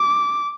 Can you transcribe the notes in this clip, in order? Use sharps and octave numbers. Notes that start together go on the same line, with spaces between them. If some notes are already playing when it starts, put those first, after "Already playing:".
Already playing: D6